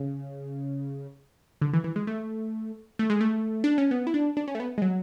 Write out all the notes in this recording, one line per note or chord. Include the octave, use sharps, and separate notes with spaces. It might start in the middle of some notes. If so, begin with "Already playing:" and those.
Already playing: C#3
D3
E3
E3
G#3
A3
A3
G#3
A3
D4
C#4
B3
E4
D4
D4
C#4
A3
B3
G#3
F#3